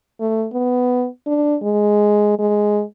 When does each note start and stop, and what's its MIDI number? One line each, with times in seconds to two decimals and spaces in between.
0.20 0.47 57
0.53 1.07 59
1.27 1.56 62
1.62 2.35 56
2.39 2.82 56